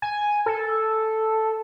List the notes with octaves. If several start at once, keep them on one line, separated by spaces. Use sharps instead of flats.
G#5
A4